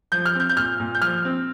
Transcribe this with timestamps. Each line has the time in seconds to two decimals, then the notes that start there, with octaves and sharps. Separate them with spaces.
0.12 F3 G6
0.25 F6
0.35 C4 G6
0.49 G6
0.57 A#2 F6
0.80 A#2
0.95 G6
1.02 F3 F6
1.25 C4